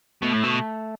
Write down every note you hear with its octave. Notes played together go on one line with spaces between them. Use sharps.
B2 A3
A2
B2